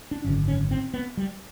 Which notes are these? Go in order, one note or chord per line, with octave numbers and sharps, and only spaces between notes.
D4
G#1 F#2 D3 C#4
C#4
C4
B3
G3